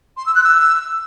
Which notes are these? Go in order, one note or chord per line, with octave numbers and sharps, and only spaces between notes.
C6
E6
F#6
E6